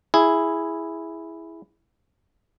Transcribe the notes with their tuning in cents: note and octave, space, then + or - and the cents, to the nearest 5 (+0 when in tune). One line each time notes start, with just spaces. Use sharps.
E4 +0 G#4 +0